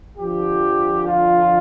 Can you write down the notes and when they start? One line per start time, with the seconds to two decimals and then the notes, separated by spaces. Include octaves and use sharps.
0.17 F2 D3 F3 G4
1.06 F4